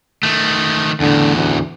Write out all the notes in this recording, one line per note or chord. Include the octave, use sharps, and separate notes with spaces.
D#3 A3
E2 A2 D3
D2